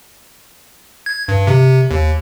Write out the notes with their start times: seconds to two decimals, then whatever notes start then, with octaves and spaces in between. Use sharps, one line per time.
1.06 G#6
1.28 G2
1.47 C3
1.91 D#2